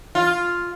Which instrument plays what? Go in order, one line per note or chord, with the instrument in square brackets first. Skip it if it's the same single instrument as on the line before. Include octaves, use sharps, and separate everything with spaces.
[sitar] F4